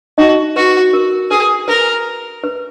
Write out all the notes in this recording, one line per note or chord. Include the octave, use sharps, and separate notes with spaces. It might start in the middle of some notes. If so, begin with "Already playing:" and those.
D#4 F#4 D#5
F#4 B4
A#4
G#4 B4
A#4 B4
B4